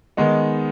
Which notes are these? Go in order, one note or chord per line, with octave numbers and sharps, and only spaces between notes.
D#3 G#3 B3 D#4